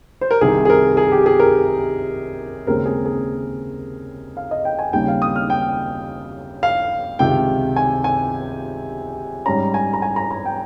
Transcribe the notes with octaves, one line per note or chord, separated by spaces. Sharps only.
C5
A#4
C2 C3 D#3 G#4
G#4
A#4
G#4
G4
G#4
A#4
D#2 C#3 G#3 C4 A#4
G#4
G#4
F5
D#5
G5
G#5
D#2 C#3 G3 C4 D#4 G5
F5
D#6
F6
G5
F5
C#2 C3 D#3 G5
G#5
G#5
G#2 G3 C#4 A#5
G#5
A#5
G#5
A#5
A#5
G5